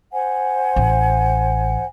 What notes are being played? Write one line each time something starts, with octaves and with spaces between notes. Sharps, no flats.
C5 F#5 G#5
A1